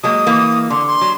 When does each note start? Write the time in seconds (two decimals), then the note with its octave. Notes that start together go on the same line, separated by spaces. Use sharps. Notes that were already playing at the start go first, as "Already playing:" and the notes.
0.03 F#3 G#3 A#3 D#6
0.27 E3 A#3
0.70 D3 C6
0.87 C6
1.01 F#3